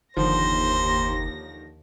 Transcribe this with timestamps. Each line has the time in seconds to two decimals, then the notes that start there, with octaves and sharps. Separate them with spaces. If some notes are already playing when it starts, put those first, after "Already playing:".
0.17 F#1 D#2 D3 D#3 F3 C5 A#6